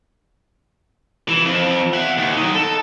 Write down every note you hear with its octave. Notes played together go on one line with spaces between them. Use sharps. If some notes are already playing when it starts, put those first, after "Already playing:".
E3
F2
E5 F#5
D#2
F#3 D#4
A4